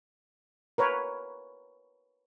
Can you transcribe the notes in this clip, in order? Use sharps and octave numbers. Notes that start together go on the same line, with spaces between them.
A#4 B4 C#5